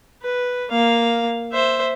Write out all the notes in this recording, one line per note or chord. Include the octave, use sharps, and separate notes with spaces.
B4
A#3 F5
C5 E5